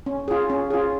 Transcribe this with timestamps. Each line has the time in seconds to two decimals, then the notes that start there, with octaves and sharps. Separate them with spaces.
0.06 C#4
0.28 F4 G#4
0.50 C#4
0.71 F4 G#4